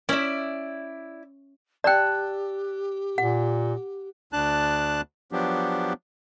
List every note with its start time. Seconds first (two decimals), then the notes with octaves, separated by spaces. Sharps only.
0.09 C#4 E4 D5 E5
1.84 G4 D5 G5 A5 E6 F#6
3.18 A#2 F#5
4.33 D2 D4 A5 F#6
5.32 F3 F#3 B3 D4 G4